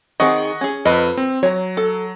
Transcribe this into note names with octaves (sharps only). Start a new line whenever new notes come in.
D#3 C4 G#4 D#5 F#5 C#6
C#4 G#4
F2 B4 D#5
C4
F#3 C#5 A#5
A4